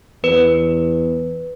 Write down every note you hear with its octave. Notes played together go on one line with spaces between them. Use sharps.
E2 B4